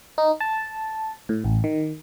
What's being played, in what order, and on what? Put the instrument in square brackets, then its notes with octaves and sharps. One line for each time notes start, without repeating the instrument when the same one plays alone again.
[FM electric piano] D#4
A5
A2
A1
D#3